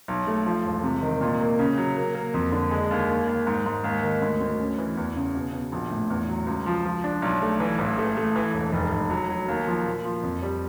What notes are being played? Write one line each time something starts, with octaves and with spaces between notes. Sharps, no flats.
B1
A3
F3
E1
C3
D#3
A#2
A#3
C#3
F#3
A#3
A#3
F2
D3
G#3
D#2
D#2
D#2
G#2
G#2
D#2
D#3
D2
D2
C#4
E3
E2
C#3
B2
B2
A#1
A2
E2
F#3
C#2
F3
F3
D4
B1
A3
E3
A1
A3
A3
E3
E1
F1
F1
F#3
F#3
D#2
F3
A#2
F3
F2
G3